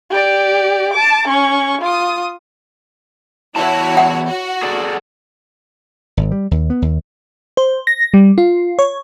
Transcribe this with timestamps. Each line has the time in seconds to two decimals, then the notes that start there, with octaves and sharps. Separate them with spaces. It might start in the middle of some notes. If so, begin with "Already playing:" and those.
0.11 G4 D5
0.93 A5 D6
1.28 C#4 C#6
1.81 F4 D#6
3.56 E2 G#2 E4 F#4 C#5 A5
3.97 F#5
4.28 F#4
4.63 G#4 A4 D5
6.17 G#1
6.32 G3
6.51 D#2
6.70 B3
6.82 D#2
7.57 C5
7.87 A#6
8.14 G3
8.38 F4
8.79 C#5